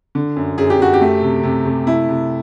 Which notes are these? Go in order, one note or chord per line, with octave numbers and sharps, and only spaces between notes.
D3
F#2
F#2 G#4
G4
F#2 F#4
G4
A3
C3
C3
C3
A3 E4
C3